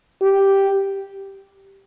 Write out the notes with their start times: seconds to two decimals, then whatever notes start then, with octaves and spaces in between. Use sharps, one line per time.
0.22 G4